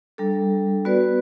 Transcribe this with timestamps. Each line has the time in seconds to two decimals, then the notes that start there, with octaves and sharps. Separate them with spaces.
0.18 G3 D4 A4
0.85 B3 F#4 B4 D5